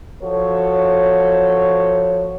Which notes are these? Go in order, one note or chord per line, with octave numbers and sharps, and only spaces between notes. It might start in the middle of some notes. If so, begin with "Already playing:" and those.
F3 F#4 A4 C#5